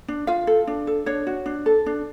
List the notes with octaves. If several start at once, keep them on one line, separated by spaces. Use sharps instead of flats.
D4
F4 F5
A4
D4
A4
D4 C#5
F#4
D4
A4
D4